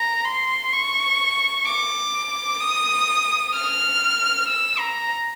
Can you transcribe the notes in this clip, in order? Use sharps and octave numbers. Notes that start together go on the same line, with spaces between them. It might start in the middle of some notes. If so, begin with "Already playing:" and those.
Already playing: A#5
C6
C#6
D6
D#6
F6
E6
A#5